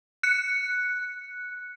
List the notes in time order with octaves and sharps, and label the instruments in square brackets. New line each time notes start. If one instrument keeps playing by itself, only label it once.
[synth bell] F#6 C#7